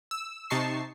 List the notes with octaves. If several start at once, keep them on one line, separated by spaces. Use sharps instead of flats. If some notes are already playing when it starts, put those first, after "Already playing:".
E6
C3 D#4 A5 C#6 C7